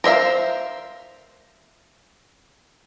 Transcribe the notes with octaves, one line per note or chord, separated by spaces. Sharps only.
A#4 C5 E5 F5